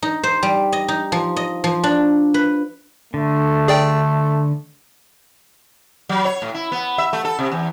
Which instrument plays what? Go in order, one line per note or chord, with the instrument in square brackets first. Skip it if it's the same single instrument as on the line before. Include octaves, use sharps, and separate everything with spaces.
[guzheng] D#4
C5
G3
D#5
D#4
F3
D#5
F3
D4
B4
[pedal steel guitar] D3 [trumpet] A3
[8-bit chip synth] G#4 D5 G5
[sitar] F#3
C#5
A2
E4
B3
E5
A3
A4
C3
E2